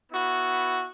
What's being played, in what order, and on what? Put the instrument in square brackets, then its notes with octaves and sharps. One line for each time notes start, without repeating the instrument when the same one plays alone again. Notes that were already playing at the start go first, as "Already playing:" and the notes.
[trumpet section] B3 E4 F#4